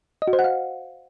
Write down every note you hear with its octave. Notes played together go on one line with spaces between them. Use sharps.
D#5
F#4
C5
F#5
F5